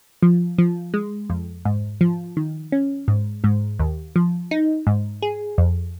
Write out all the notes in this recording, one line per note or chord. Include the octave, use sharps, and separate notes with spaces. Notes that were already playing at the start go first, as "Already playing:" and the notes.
F3
F3
G#3
F2
G#2
F3
D#3
C#4
G#2
G#2
D#2
F3
D#4
G#2
G#4
F2